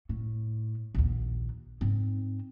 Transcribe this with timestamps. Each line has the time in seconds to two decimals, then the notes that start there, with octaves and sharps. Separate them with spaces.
0.09 A2
0.95 A#1 D#2
1.81 G#2 C4